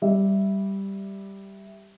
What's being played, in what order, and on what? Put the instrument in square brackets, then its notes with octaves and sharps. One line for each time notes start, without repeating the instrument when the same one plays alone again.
[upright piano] G3 E5